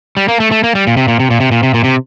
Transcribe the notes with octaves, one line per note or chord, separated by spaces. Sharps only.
G3
A#3
A3
A3
A#3
G3
A#2
C3
A#2
C3
A#2
C3
A#2
C3
A#2
C3